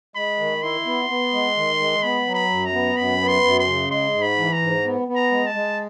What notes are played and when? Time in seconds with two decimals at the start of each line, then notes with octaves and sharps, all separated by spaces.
0.16 G#3 B5
0.39 D#3
0.63 E4 C6
0.86 B3
1.09 B3
1.33 G#3
1.57 D#3
1.80 G#3
2.03 B3 B5
2.26 F#3
2.34 B5
2.50 F#2
2.66 A#5
2.74 B3
2.97 F#2 B5
3.21 B3
3.28 C6
3.44 F#2
3.60 C6
3.67 C#3
3.90 G#3 C6
4.14 G#2
4.22 B5
4.38 E3
4.53 A#5
4.62 G#2
4.85 B3
5.08 B3
5.16 A#5
5.31 G#3
5.47 A5
5.54 G#3